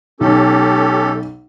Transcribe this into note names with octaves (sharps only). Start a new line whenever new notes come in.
B1 C#4 G4 A4